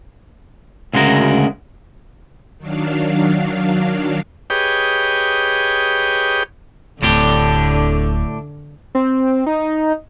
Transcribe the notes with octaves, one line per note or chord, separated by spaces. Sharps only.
D2 C#3 G#3 F#4 A#4
D#3 F#3 D4 F5
G4 G#4 B4 C#5 D#5 G5
D1 A2 D3 D4 G4
C4
D#4